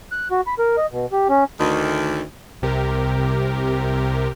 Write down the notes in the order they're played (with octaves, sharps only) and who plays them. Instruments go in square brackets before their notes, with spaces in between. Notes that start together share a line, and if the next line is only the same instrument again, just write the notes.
[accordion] F#6
F#4
B5
A#4
D#5
B2
G4
C#4
[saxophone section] D2 D#3
[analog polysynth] C2 C3 G4 A#4